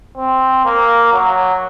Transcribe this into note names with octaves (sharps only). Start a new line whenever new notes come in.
C4
A#3
F#3